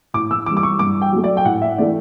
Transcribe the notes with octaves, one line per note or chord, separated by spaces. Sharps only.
A2 D6
E6
E3 G3 D6
D6
C#6
G2 D6
G5
F#3 A3
D5
G5
A2 F#5
E5
E3 A3 D5